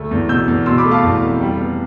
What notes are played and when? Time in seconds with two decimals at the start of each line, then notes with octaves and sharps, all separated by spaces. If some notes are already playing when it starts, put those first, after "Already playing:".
Already playing: D2 A3
0.11 E2
0.29 B2 E6 G6
0.48 E2
0.66 B2 C6 E6
0.78 B5 D6
0.85 A3
0.91 F5 A5
1.03 E2
1.22 F1
1.41 G3
1.59 B3